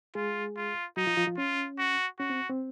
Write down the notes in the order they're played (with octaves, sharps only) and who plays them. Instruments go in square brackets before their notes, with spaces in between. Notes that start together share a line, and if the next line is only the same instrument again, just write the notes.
[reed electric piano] G#3 G#4 [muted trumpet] F4
[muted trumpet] F4
[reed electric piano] F#3 F#4 [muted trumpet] D#4
[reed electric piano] F3 F4
F3 F4
F3 F4
[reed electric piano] C#4 [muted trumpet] F4
[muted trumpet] F#4
[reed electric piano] C#4 [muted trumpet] F#4
[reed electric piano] C4
C4